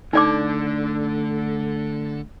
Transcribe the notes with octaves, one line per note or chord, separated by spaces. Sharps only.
D3 A3 D#4 A4 D5 D6